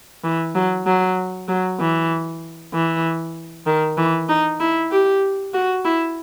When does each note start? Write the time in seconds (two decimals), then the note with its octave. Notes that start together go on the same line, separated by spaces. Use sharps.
0.24 E3
0.55 F#3
0.87 F#3
1.48 F#3
1.80 E3
2.73 E3
3.67 D#3
3.98 E3
4.29 D#4
4.60 E4
4.91 G4
5.54 F#4
5.85 E4